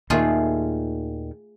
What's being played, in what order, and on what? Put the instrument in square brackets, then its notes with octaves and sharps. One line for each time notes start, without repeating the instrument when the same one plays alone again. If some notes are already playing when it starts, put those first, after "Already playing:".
[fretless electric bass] D#2 A#2 D#3 [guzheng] A3 F4 G#4